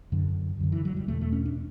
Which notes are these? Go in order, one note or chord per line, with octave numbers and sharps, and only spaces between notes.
F#2 D3
F#2 D3
E3
F#3
G3
E2 B2 A3
A3
C#4
D4